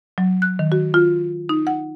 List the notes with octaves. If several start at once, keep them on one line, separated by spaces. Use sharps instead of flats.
F#3
F#6
D#3
F#4
F4
D#4
F#5